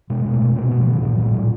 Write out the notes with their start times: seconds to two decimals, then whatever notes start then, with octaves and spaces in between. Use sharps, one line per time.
0.10 B2 G#3
0.25 B2
0.33 A3
0.42 B2
0.56 B2 C#4
0.67 B2 B3
0.79 F3
0.87 B2 D#3
1.02 A#2 E3
1.15 A#2 F#3
1.26 G3
1.34 A#2